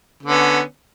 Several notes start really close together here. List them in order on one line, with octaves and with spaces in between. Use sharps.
D3 B3 C#4